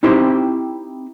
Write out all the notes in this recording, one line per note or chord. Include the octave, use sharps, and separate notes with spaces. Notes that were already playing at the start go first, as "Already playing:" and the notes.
C4 D#4 E4 G4 C5 C6